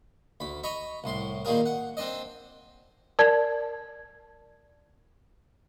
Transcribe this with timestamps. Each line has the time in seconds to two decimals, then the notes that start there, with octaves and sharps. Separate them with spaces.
0.40 D2 B5
0.64 D#5 A#5 B5 C#6
1.04 C2 A2 C6
1.45 A#2 D#3 G3 A#3 G#4 A#4
1.66 F#5
1.97 C4 D4 D5 D#5
3.19 A#4 D5 A5 G#6